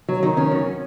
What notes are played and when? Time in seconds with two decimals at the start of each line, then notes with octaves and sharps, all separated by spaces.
0.09 F#3
0.23 D#3
0.37 C#4
0.52 F#2